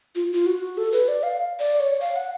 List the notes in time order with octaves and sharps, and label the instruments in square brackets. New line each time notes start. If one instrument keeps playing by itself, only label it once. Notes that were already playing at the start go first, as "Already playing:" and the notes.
[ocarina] F4
F4
F#4
A4
B4
D5
F5
D5
C#5
F5
F#5